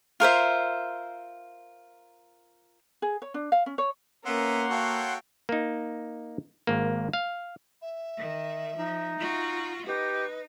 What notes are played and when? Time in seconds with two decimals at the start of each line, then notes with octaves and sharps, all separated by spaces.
0.20 F4 A#4 C5 E5
3.02 G#4
3.22 C#5
3.34 D4
3.52 F5
3.66 C#4
3.78 C#5
4.25 A#3 B3 C#4 A#4 E5 F#5 C6
4.70 F#4 A4 C#5 F5 G5
5.49 A#3 D#4
6.67 G#1 A#3
7.13 F5
7.81 E5
8.17 D#3
8.77 F3 D#4
9.19 F4 F#4
9.86 D#4 G4 B4